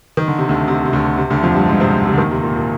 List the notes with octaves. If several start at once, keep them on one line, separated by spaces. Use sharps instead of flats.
D#3
D3
C3
D2 D3
C3
C3
D2 D3
C3
D2 D3
F2 F3
G2 G3
G#2 G#3
C3 C4
C3
D3
D#2 D#3
C3
A#2
A#2